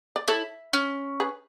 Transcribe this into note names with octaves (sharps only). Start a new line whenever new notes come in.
D5
E4 A4 C#5
C#4
G#4 B4